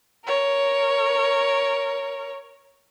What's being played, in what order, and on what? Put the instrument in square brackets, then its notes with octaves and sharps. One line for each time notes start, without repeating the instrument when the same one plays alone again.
[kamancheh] A#4 C#5